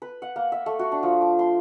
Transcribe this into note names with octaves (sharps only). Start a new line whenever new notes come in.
B4
F#5
A#3
E5
A3
F#4
D4
F3
D6
C6